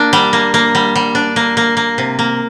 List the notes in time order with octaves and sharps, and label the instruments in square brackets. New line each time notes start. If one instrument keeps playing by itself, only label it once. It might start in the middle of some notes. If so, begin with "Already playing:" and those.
Already playing: [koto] A#3 D4
G3
A#3
A#3
G3
G3
D4
A#3
A#3
A#3
C3
A#3